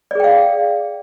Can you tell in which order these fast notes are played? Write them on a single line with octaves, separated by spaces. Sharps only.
D5 G#4 G5 F5